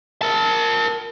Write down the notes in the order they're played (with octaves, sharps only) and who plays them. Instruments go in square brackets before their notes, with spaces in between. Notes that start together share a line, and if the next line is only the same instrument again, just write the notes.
[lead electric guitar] A#4 A5